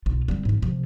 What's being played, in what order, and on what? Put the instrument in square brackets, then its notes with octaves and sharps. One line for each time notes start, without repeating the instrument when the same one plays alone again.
[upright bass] B1 F4
G3 C4
G#2 E3
C3 F3